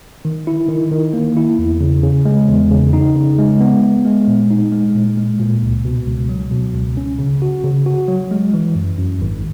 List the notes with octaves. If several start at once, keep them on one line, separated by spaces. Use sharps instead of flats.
D#3
E4
D#3
D#3
A#3
E4
E2
C#3
C#3
G#3
E2
C#3
D#4
C#3
G#3
B3
B3
G#3
A#2
D#4
G#3
A#2
G#3
A#2
C#2
B2
C#2
F#3
B2
C#2
C#4
C#3
F#4
C#3
F#4
F#3
G#3
E3
F#2
F#2
G#1